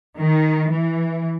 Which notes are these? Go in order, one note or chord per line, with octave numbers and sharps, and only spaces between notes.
D#3
E3